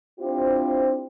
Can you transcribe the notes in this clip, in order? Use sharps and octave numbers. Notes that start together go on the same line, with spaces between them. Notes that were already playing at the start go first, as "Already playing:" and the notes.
C4 D4 E4 F4 G4 C5